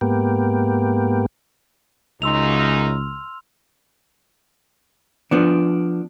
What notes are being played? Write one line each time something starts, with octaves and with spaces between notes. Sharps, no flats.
G#2 A#3 B3 G4
C#2 F#2 C#3 D#4 C6 E6 F7
E6 F6
F3 B3 D4